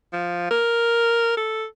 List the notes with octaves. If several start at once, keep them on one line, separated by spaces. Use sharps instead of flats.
F3
A#4
A4